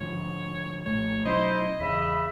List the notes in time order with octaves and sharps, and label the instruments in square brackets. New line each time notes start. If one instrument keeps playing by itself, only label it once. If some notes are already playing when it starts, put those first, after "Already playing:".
[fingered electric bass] G#2 D3 F3 [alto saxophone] C#5
[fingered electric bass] A#1 A2 A3 [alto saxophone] C#5
[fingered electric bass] B2 F#3 C#4 [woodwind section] D#4 E4 C5 [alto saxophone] D#5
[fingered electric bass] E2 G#2 [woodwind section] C#3 E5 B5